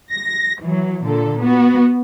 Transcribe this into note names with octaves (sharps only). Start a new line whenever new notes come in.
A#6
E3 F#3
A#2 D3 A4
B3 F#4